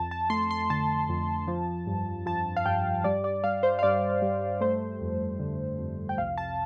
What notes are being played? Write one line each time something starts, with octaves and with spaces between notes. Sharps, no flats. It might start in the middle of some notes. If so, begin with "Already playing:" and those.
Already playing: F2 A5
A5
A3 C6
C6
D3 A5
F2
F3
G2
F3 A5
F5
G2 G5
G3 D5
D5
G3 F5
C5
F5
G2 D5
G3
A3 C5
F2
D3
F2
G5
C2 F5
A5